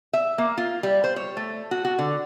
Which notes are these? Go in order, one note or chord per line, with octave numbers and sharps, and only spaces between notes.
E5
A#3
F4
G3
C5
C#5
A3
F#4
F#4
D3